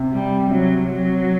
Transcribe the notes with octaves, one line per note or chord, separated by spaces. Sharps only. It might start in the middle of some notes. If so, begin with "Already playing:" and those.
Already playing: C3
G3
C3 F#3
F#3